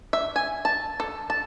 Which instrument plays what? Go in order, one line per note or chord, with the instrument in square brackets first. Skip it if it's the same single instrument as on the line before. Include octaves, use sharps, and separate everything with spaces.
[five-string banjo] E5
G#5
A5
A4
A5